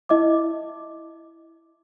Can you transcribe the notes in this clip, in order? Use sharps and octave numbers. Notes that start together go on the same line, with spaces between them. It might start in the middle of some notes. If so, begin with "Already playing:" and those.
E4 D#5 E5 D6